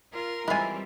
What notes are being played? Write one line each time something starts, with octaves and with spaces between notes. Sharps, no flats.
F4 A#4
E3 G3 G#3 C4 E4 F4 G#5